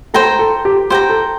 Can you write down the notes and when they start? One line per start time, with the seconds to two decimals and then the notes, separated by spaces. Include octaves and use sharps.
0.14 A4 C5 G5 A#5
0.39 A4
0.65 G4
0.90 G4 C5 G5 A#5
1.09 A4